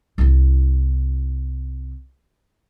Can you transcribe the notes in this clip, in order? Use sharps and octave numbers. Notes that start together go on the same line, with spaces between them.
C2 E4